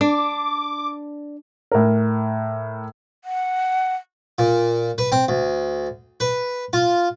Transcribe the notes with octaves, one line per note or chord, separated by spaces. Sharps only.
D4 D6
A2 A#4
F#5
A#2
B4
C4
D2
B4
F4